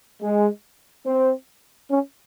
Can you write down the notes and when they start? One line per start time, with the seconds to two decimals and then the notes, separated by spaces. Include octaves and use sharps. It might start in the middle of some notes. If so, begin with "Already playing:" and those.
0.22 G#3
1.06 C4
1.91 C#4